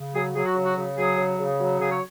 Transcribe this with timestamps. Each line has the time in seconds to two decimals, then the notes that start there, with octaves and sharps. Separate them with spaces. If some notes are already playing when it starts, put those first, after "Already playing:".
Already playing: C#3
0.13 F#3 G#4
0.34 F#3 G#4
0.44 F#4
0.55 C#3
0.63 F#4
0.75 C#3
0.96 F#3 G#4
1.17 C#3
1.38 C#3
1.59 F#3
1.79 C#3 G#4
1.90 C#5